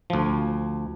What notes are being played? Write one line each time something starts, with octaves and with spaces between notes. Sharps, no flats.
D2 F3